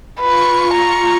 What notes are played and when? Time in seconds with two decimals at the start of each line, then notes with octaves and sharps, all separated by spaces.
0.20 F4 B4 C#6 C#7
0.74 A#5